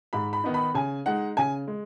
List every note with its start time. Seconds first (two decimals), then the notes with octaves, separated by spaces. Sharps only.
0.13 G#2 B5
0.33 B5
0.44 D#3 B3 D#4
0.54 B5
0.74 C#3 G#5
1.06 G#3 D#4 F#5
1.37 C#3 G#5
1.67 G#3